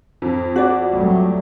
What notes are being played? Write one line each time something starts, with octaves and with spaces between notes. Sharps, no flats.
F2
F#4 D5
F#3 G3 A3